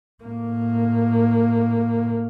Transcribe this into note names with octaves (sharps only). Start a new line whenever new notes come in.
A2 A#3